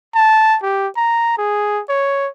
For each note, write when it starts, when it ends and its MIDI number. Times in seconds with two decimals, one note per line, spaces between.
0.15 0.57 81
0.63 0.88 67
0.97 1.36 82
1.38 1.81 68
1.89 2.28 73